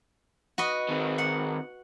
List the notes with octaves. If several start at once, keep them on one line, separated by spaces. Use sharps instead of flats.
F#4 B4 D#5
D#3 C4
F#5